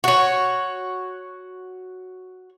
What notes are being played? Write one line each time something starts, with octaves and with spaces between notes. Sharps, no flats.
F#4 C#5